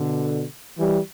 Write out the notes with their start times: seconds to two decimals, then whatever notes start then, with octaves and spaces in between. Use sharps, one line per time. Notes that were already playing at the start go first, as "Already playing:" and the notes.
Already playing: B2 D3
0.78 E3 G3